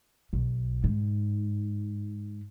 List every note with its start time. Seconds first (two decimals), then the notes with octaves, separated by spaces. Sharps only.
0.33 B1
0.84 G#2